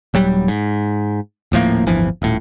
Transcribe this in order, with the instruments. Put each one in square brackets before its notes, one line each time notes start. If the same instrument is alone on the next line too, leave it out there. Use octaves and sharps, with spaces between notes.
[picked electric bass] D#1 F#3 G3
G#2
D#1 A2 F3 A#3
D1 G1 E3 F3
D#1 A2